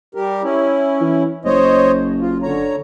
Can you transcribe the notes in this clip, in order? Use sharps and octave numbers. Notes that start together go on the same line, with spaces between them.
G3 G4 A#4
C#4 E4
E3
F#1 C5 C#5 D#5
F4
D3 C#5 A#5